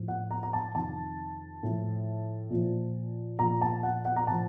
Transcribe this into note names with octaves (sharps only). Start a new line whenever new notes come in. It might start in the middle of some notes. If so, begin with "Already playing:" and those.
Already playing: A2 F3
F#5
A#5
A#5
A5
F2 C3 D#3 A5
A2 F3
A#2 F3
A#2 F3 A#5
A5
F#5
F#5
A#5
A2 F3 A5